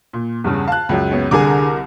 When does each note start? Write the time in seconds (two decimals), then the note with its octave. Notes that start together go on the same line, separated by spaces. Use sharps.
0.13 A#2
0.44 E2 G2 C#3
0.68 F5 A5 F#6
0.89 C#2 F#2
1.11 B3 C#4
1.31 C2 D3 G#4 A#4 D6